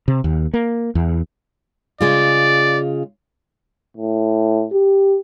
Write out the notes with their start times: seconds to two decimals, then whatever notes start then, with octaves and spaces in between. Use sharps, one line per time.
0.08 C3
0.24 D#2
0.54 A#3
0.95 E2
2.01 C#3 G#3 F4 D5
3.97 A2
4.73 G4